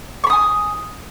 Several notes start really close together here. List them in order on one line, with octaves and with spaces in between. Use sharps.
C#6 B5 D#6 G#5